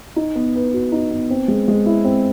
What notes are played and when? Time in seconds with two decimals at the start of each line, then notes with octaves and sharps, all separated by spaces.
0.16 D#4
0.35 B3
0.55 B4
0.73 F#4
0.92 D#4
1.11 B3
1.30 C4
1.48 G#3
1.68 G#3
1.86 E4
2.05 C4